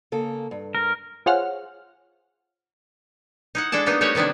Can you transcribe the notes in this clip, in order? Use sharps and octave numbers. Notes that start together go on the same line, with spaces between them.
C#3 A#3 A4
G2
A#4
F4 G#4 C5 C#5 F#5 F6
D#4 E4 F#5
G#3 D4 A4 D5 A5
A#3 B3 D4 D#4
G3 A3 F#4 G4 B4 C#5
C3 D#3 B3 D4 E4